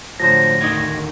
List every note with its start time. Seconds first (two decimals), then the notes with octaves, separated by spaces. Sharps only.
0.20 A2 D3 F3 F#3 C5 A#6
0.61 D2 D#3 D#5 G#6